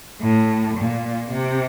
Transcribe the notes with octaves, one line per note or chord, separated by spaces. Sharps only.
A2
A#2
C3